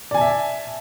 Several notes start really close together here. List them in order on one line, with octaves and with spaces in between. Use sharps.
D5 G#5 A5 E5